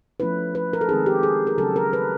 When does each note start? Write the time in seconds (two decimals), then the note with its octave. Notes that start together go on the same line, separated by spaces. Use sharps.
0.20 F3 A3 C#4 E4 B4
0.55 B4
0.73 A#4
0.81 A4
0.89 D#3 G#3 C4 D#4 G#4
1.06 G4
1.23 G#4
1.47 A#4
1.58 C#3 F#3 A3 C#4 A4
1.76 A#4
1.93 B4